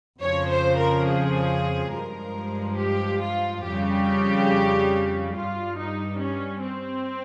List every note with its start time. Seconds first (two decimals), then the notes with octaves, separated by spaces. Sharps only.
0.22 F2 C#3 F3 C#5
0.50 C5
0.78 A#4
1.07 G#4
1.93 G2 F3 G#3 A#4
2.78 G4
3.21 F4
3.64 F2 C#3 G3 G4
5.35 G2 G3 F4
5.78 D#4
6.20 C#4
6.63 C4